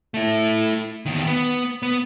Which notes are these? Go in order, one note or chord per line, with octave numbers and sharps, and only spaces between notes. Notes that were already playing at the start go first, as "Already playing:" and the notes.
A3 E4
E2 D#3
B3
B3